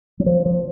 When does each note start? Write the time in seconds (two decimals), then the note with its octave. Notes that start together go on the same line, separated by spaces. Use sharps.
0.20 F#3
0.26 F3
0.46 F3